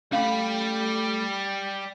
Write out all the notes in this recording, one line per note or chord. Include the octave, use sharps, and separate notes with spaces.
G3 A3 C#4 F5 B5